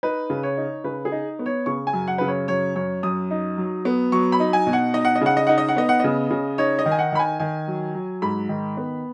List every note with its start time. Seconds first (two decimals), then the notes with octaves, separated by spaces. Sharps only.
0.03 D#4 B4
0.30 C#3
0.43 C#5
0.57 D#4
0.84 C#3 B4
1.05 G#4
1.12 D#4
1.39 B3
1.46 C#5
1.66 C#3 C#6
1.87 G#5
1.93 F#2
2.08 F#5
2.18 C#3 B4
2.28 C#5
2.48 F#2 C#5
2.76 F#2 C#5
3.03 F#2 D#6
3.31 D#4
3.58 F#3
3.85 B3
4.12 F#3 C#6
4.32 B5
4.40 D#4
4.53 G#5
4.67 B2
4.73 F#5
4.94 D#4 D#5
5.05 F#5
5.16 D#5
5.21 C#3 F#5
5.37 D#5
5.47 D#4 F#5
5.58 D#5
5.69 F#5
5.77 B3 D#5
5.89 F#5
6.00 C#3 D#5
6.31 C#3
6.58 D#4 C#5
6.79 D#5
6.86 D#3
6.92 G#5
6.99 F#5
7.12 D#3 B5
7.19 G#5
7.40 D#3 G#5
7.68 F#3
7.95 F#3
8.22 G#2 B5
8.49 D#3
8.77 B3